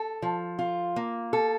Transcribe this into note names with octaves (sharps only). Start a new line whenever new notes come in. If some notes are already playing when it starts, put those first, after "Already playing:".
Already playing: A4
F3
F4
A#3
A4